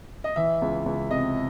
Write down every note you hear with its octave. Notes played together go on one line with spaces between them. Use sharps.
D#5
E3 E5
C#2
C#2
C3 D#5